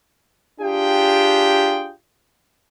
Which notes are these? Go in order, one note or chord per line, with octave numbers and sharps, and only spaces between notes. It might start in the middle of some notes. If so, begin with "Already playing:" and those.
D4 F4 G4 G#4 G5